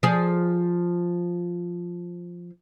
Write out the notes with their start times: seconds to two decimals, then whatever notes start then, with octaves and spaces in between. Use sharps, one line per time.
0.03 F3 G#4